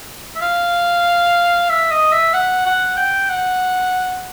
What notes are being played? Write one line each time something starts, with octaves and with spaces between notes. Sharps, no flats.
E5
F5
E5
D#5
E5
F#5
F#5
G5
F#5